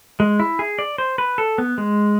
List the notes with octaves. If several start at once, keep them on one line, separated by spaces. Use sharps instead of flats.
G#3
E4
G#4
D5
C5
B4
A4
B3
G#3